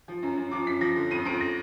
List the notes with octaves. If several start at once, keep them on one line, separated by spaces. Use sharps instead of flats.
F3
F#2
F#2
F3 D6
F#2 B6
F3 A#6
D3
F2 D#7
F2 D7
A#6